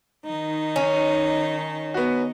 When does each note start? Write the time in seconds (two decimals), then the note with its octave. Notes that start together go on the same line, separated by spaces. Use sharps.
0.25 D#3 D#4
0.76 C#4
1.94 B3 F#4